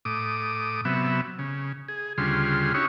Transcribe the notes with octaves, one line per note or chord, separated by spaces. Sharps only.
A2 D6 D#6
C3 F#3 B3 E5
C#3
G#4
D2 C#3 G3 F4 G#4 C6
C#4 D#4 E4 F#4 G4 C#5